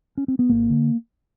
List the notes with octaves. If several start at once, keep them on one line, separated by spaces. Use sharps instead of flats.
C#4
C4
B3
G#1 A#3
D3